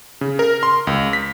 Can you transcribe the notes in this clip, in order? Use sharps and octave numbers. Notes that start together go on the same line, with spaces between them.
C#3
A#4
C6
C#2
B6